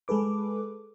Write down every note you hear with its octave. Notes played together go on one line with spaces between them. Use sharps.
G#3 G#4 A4 B4 D6